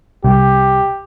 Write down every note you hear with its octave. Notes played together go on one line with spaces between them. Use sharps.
C2 G4